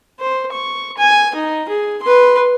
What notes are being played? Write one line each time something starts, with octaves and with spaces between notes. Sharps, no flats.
C5
C#6
G#5
D#4
G#4
B4 C6